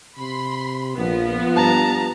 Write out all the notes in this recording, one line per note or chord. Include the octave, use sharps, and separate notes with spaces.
C3 B5 C6
A#1 F3 B3
G2 A5 A#5